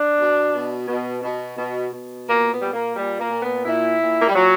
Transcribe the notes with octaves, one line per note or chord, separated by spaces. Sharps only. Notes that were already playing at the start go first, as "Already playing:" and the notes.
Already playing: D4
B2
B2
B2
B2
B2
B2
A#2 A#3
B3
A#2 G3
A#3
A#2 G3
A#3
A#2
B3
A#2 E4
A#2
A#3
G3
A#2 F#3